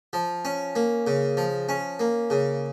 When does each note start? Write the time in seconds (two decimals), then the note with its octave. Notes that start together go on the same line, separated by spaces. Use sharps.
0.13 F3
0.45 C#4
0.76 A#3
1.07 C#3
1.37 F3
1.69 C#4
2.00 A#3
2.30 C#3